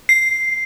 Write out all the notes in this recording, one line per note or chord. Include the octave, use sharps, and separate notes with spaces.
C7